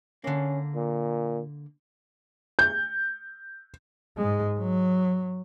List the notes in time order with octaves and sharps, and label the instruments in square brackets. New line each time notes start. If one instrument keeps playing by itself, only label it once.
[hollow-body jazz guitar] D3 A#3 [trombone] C#4
[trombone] A#2
[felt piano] G6
[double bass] G#2 G#3
F#3